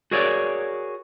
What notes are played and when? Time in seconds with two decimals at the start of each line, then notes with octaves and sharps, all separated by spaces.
0.11 F#4 G#4 A#4 C#5 D5